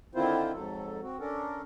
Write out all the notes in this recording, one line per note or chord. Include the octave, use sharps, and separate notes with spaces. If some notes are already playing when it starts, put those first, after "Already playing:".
D3 D#3 C4 E4 F4 C5
F2 G#2 F#3 A4
C4 F#4
C#4 D4 A4 A#4